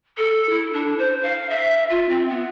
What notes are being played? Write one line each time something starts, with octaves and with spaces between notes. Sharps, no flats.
A4
E4
D4
C5
F5
E5
F4
C4
B3